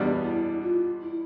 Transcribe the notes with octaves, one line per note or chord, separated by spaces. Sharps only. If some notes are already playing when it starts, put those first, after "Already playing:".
Already playing: E2 B2 G3 D4
E4
F4
E4